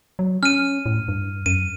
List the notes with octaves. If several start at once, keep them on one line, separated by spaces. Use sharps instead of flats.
F#3
C#4 F6 D#7
A2
G2
F#2 D#7